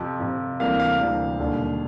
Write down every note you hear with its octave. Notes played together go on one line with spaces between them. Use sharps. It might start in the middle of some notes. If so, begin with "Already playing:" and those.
Already playing: F2 C3 F3
F2 C3 F3
D2 C3 E3 G3 A#3 F5
F5
D2 C3 E3 G3 A#3
E1 D#2 D3 G3